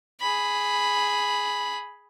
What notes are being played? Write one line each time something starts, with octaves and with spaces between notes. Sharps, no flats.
G#4 B5